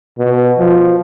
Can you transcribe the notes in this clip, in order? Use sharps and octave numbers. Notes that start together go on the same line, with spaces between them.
B2
F3